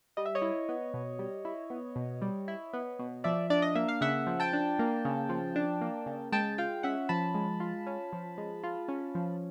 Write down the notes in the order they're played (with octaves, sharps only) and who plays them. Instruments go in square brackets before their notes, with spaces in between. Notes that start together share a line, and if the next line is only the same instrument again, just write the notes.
[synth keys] G3 D#5
E5
C#5 D#5
E4
B3
B2
G3
E4
B3
B2
G3
E4
B3
B2
F3 D5 E5
D4 D5
D#5
A#3 E5
F5
C#3 E5 F#5
F3
G5 A5
D4
A#3
C#3
F3
D4
A#3
C#3
G#3 G5 A5
F4 F5 G5
C#4 E5 F#5
F3 A5 B5
G#3
F4
C#4
F3
G#3
F4
C#4
F3